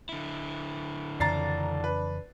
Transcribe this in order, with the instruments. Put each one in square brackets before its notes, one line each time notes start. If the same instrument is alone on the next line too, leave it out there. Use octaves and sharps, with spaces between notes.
[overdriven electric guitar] D3 E4
[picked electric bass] F2 C#3 E3 [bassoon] D4 [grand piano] A#5 A6 C7
[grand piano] B4